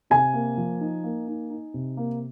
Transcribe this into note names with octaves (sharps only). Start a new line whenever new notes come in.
C3 G#5
A#3
F3
D#4
A#3
D#4
D#4
C3
A#3